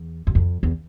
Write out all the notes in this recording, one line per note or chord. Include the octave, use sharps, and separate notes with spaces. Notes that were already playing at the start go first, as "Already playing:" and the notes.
Already playing: E2
F#2
F2
E2